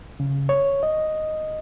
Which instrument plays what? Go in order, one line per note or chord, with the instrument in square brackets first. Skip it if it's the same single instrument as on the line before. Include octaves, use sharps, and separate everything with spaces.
[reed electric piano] C#3
C#5
D#5